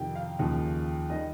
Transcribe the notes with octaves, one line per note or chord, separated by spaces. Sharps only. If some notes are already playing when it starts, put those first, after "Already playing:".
Already playing: F2 C3 D#3 G5
F5
D#2 C#3 F3
D#3 G3 D#5